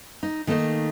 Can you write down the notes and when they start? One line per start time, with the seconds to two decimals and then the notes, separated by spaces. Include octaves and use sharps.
0.23 D#4
0.47 D#3 A3 A#3 D4 D#4